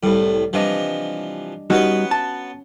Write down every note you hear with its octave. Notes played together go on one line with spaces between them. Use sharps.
C2 A2 G3
C3 E3 F3 G3 D4 D#5
F#3 G3 B3 C#4 D#4 F#4 B4
A5